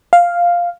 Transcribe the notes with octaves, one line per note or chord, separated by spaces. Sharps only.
F5